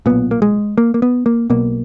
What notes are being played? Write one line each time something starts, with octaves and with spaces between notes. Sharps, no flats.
B1 A#2 B3
A#3
G#3
A#3
A#3
B3
A#3
B1 B2 A#3